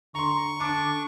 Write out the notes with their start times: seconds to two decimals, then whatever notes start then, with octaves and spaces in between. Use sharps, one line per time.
0.15 D3 A#5 C6 C#6
0.60 D4 D6 D7